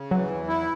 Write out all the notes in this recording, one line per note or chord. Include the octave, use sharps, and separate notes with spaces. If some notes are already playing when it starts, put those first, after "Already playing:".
Already playing: C#3
E3 F#3
E2
E4